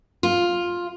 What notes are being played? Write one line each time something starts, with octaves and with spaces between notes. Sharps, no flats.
F4